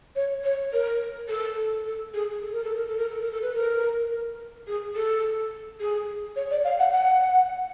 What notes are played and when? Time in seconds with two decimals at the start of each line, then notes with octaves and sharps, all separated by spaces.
0.16 C#5
0.44 C#5
0.73 A#4
1.29 A4
1.85 A4
2.14 G#4
2.42 A4
2.52 A#4
2.64 A4
2.76 A#4
2.86 A4
2.98 A#4
3.09 A4
3.20 A#4
3.31 A4
3.43 B4
3.55 A#4
4.67 G#4
4.95 A4
5.80 G#4
6.36 C#5
6.51 D5
6.64 F5
6.79 F#5
6.93 F#5